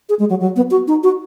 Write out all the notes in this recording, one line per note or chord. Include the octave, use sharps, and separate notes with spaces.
G#4
G#3
F#3
F#3
B3
F#4
D#4
F#4